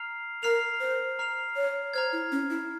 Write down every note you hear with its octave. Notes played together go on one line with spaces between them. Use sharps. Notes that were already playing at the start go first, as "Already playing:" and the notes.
Already playing: A#5 F6 C7 F7
A#4 A#5 F6 C7 F7
C5
A#5 F6 C7 F7
C#5
C5 A#5 F6 G#6
E4
C#4
E4